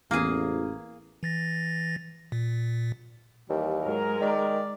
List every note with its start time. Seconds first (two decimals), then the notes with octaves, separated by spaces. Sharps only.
0.11 A1 E2 A#3 G#4
1.23 E3 A6 A#6
2.32 A#2
3.50 D#2 E3 G3 A#3
3.84 G#2 F#3 G#3 A#4
4.21 D#3 D5